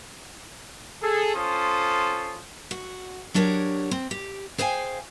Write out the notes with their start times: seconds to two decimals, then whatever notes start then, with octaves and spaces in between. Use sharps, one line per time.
1.02 G#4 A4
1.35 C#4 F4 A4 C5 C6 D#6
2.71 F#4
3.34 F#3 D4 G4 A#4 C#5
3.91 C4
4.11 G4
4.58 G#4 C5 F5 G5 G#5